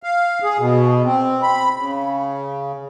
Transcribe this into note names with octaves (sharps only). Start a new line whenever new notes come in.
F5
G#4
B2
C4
B5
C#3